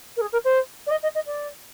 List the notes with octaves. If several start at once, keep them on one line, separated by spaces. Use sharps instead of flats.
A#4
G#4
A#4
C5
D5
D#5
D#5
D#5
D5